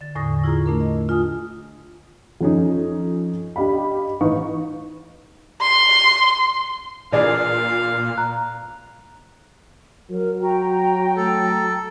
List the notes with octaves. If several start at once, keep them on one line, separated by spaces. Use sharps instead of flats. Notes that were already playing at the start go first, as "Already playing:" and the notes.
D3 A6
E2 A2 D3 C#6 D#6 A#6
E4 F4 G#4 A#5
A3 D4 A#4
D#5
F4 G#5 D#6
F2 C#4 D#4
D4 G4 D#5 F5 B5
A1 D#4 B4 F5 C#6
C6
A#2 E3 D4 G#4 F5
A#5 F#6
F#3 A#4
F#4 G5 A#5
A3 A4